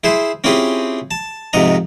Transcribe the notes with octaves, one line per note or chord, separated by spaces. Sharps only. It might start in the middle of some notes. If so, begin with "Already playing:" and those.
E4 G#4 C5 E5
C4 C#4 E4 F4 G4 G#4
A5
F2 G#2 C3 D#5 A#5